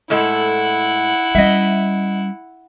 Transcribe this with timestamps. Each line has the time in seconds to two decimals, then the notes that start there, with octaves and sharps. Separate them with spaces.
0.10 A2 G#3 E4 A4 F#5
1.35 G3 C#4 D#5 E5